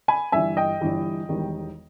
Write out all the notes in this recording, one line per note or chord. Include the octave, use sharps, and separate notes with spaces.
G#5 B5
G1 G2 E3 G3 E5 G#5
D#5 G5
G1 G2 E3 G3
E1 E2 D#3 G3